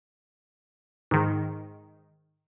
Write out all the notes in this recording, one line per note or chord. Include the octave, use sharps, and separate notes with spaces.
G#2 D#3